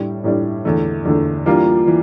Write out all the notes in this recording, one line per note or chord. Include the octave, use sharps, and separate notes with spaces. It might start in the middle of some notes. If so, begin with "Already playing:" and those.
Already playing: A2 G3 D4
A2 G3 D4
E2 D3 A3
E2 D3 A3
E3 G3 A#3 D4 F4
E3